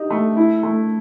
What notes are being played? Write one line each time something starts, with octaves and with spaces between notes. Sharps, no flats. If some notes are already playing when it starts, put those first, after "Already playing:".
Already playing: D#4 G4
A3
E4
A3